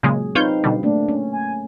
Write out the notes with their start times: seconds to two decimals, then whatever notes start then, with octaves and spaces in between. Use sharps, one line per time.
0.03 A#2 C#3 F#3 G#3 G#4
0.35 C4 D#4 F4 B4 C#5 F5 G6
0.64 B2 D3 G3
0.83 A3 A#3 D4
1.09 C#4
1.33 G#5